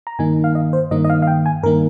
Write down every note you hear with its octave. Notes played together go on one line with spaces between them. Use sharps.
A#5
G2 D#3 A#3 D#4 G#5
F5
D#5
C5
G2 D#3 A#3 D#4 D#5
D#5
F5
F5
G5
G#5
G2 D#3 A#3 D#4 A#4